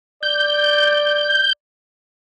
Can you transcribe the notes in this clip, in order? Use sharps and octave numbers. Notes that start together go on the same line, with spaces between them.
D5 G6